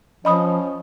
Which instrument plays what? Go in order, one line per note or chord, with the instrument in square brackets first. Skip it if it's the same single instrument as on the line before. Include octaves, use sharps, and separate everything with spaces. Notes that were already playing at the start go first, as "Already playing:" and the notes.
[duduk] F3 [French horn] C#4 [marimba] D#5 B5 D#6